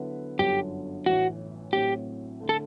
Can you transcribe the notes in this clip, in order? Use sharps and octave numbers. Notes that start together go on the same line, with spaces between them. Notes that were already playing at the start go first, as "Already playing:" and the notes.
Already playing: D3 F#3 B3 E4 B4
G1 F#2 D3 F#3 G4
A1 A2 E3 F#4
A2 F#3 C4 G4
D3 A3
A4